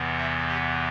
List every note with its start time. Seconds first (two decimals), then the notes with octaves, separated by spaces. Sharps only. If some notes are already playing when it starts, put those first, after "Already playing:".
Already playing: E2 C3 E3 B3
0.18 E5
0.48 G4